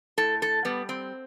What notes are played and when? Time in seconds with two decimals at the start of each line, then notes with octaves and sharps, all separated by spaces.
0.18 A2 A4
0.42 A4
0.65 G3 B3
0.89 C4